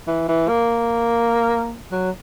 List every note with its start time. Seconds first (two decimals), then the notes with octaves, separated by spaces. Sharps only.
0.08 E3
0.29 E3
0.49 A#3
1.92 F#3